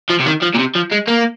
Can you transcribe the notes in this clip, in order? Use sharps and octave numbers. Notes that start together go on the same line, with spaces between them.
F3
C3
D#3
F3
A#2
C3
F3
G#3
A#3